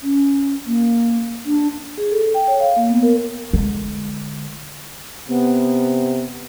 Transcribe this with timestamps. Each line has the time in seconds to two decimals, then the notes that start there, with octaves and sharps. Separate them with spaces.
0.03 C#4
0.66 A#3
1.46 D4
1.98 G#4
2.12 A4
2.34 G5
2.48 C#5
2.60 F5
2.76 A#3
2.89 B3
3.03 A#4
3.53 D3 G#3
5.29 C3 B3